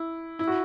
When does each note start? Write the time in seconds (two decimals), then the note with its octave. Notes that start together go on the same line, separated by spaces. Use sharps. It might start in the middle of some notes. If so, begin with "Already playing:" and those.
Already playing: E4
0.39 E4
0.48 F#4